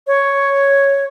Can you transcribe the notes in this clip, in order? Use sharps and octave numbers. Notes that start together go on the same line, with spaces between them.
C#5